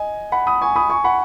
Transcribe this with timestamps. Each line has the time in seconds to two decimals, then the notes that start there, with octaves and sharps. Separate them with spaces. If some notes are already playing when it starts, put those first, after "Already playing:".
Already playing: D#5 G#5
0.32 F#5 B5
0.47 B5 D#6
0.61 G#5 C#6
0.76 B5 D#6
0.90 G#5 C#6
1.04 F#5 B5